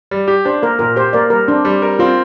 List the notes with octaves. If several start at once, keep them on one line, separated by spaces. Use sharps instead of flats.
G3
G4
D4 C5
A#3 A#4
A#2 A#4
G4 C5
A#3 A#4 D5
G3 A#4
C4 D4
G3
A#4
C4 F4